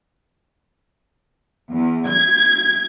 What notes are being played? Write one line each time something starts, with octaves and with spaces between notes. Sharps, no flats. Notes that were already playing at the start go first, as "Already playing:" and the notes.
E2
G#6